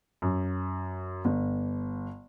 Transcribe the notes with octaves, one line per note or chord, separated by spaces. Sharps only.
F#2
G1